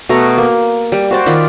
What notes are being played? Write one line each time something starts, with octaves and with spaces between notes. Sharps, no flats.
B2 A3 A#5
A#3
G3
F#4 C5 D5
D#3 F4 D5 B5